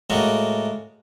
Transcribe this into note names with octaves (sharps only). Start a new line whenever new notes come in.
A2 G#3 A#3 F#4